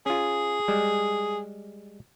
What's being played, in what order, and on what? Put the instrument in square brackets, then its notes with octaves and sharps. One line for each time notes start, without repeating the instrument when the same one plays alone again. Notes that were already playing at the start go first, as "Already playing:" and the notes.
[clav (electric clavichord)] C#4 F4 [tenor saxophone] G#4
[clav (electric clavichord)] G3 G#3